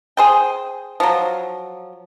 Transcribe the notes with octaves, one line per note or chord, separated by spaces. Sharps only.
G#4 C5 G5
F3 F#3